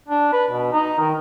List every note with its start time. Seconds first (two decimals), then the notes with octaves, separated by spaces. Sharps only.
0.08 D4
0.33 B4
0.51 B2
0.72 D#4
0.99 D#3